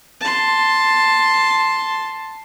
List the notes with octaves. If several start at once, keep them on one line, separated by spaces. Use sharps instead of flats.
A5 C6